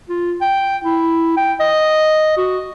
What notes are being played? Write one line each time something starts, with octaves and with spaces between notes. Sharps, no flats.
F4
G5
E4
G5
D#5
F#4